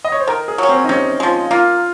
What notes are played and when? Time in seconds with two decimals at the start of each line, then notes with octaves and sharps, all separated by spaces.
0.04 D#5
0.12 C#5
0.20 C5
0.28 D#3 A#4
0.48 G#4
0.58 F#3 C#4
0.69 C4
0.84 D#4
0.89 C3 C#4
1.20 F3 G#3
1.51 A#3 F4